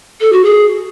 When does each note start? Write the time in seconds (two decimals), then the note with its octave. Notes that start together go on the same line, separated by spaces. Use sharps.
0.21 A4
0.33 F#4
0.44 G#4